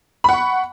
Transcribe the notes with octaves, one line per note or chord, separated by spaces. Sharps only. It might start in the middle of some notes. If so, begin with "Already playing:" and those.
F#5 B5 C#6